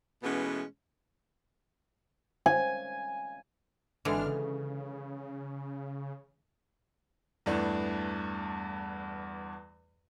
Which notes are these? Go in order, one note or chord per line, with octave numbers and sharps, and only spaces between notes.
B2 E3 G#3 A3 B3 C#4
G#5
G#1 D3 E3 G#3 D4 F6
C#3
E2 G2 E3 A3 D4